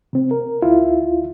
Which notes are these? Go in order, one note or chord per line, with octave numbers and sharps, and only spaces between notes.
C3 C4
A#4
D2 E4 F4